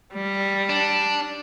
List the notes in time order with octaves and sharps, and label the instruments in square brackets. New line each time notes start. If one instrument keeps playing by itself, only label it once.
[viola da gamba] G3
[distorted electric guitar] D4